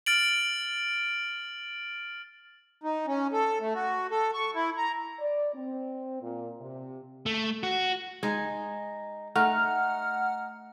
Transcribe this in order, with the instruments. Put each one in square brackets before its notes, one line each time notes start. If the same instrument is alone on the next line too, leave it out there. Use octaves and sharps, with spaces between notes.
[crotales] F6 A6 D7 F#7
[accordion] D#4
C#4
A4
A3
F#4
A4
C#6
E4
A#5
[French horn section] D5
C4
A#2
C3
[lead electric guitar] A3
F#4
[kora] G#3 [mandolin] D#4 G#5
[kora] A3 [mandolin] D#4 [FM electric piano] F#5 F6